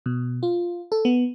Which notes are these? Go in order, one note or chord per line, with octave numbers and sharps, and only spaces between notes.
B2
F4
A4
B3